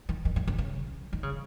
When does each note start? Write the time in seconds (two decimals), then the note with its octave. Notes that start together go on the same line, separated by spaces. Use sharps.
0.09 D#3
0.25 D#3
0.36 D#3
0.48 C#3
0.58 C#3
1.13 D#3
1.23 C#3